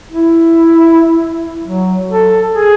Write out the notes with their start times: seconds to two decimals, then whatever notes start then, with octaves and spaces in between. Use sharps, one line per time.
0.11 E4
1.64 F#3
2.10 A4
2.54 G#4